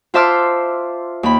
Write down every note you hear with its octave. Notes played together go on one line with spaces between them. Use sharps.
F4 C5 E5 A5 D6 F6
D#2 B5